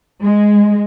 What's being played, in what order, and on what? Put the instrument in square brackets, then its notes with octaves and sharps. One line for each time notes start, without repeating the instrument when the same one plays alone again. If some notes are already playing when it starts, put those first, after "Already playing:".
[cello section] G#3